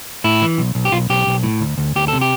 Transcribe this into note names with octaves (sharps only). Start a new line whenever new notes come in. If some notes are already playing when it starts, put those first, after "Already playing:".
A2 E4
E3
B1
B1
G4
B1 F4
B1 G4
B1
A2
D2
D2
D2 G4
C3 A4
G4